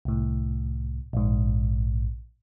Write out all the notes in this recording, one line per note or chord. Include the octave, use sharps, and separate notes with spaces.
C2 A2
A#1 G#2